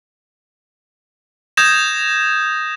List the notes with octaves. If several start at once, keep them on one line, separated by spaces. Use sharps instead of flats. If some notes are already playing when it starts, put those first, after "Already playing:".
D#6 G6 G#6 A#6 E7